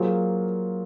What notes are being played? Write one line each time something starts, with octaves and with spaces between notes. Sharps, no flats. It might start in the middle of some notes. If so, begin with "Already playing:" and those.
Already playing: F#3 A#3 F4 G#4 C5